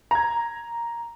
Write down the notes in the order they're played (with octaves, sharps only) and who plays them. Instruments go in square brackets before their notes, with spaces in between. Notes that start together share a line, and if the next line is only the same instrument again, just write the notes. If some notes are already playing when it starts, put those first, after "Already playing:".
[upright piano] A#5 G#6